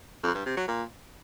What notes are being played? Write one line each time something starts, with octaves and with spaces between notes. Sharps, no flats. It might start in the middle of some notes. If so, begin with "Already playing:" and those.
F2
G2
C3
F#3
A#2